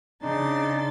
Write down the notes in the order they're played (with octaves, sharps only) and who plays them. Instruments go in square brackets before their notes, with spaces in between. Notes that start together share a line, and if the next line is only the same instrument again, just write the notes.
[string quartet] C#3 C6 A6 [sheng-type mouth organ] D4 D#4